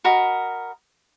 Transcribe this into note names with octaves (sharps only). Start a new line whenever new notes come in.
F#4 A#4 D#5 B5